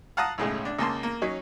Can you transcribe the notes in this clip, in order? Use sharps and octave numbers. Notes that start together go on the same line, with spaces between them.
F5 F#5 A5 A#5 D#6
B1 A2 C#3 G#3
D4
C#2 A#3 A5 C6
A#3
F#3 C#4 D#4